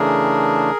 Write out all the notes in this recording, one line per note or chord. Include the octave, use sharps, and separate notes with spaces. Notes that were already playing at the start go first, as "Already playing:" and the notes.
Already playing: C#3 E3 A3 D4 G#4 A#4